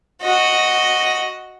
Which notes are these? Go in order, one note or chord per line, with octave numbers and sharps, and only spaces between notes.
F#4 D#5